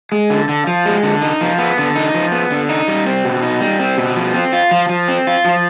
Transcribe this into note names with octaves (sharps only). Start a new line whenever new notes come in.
G#3
D3
D3
F3
G#3
D3
D#4
F3
B3
D3
D#4
F3
B3
D3
D#4
G3
C4
B2
D#4
G3
C4
B2
F3
C4
F4
F3
F3
C4
F4
F3